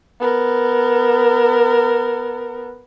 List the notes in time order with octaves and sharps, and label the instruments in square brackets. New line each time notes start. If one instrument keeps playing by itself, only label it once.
[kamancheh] B3 A#4